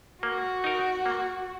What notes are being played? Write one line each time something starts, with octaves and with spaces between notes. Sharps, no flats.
A#3 F#4
D#4 A#4
A#3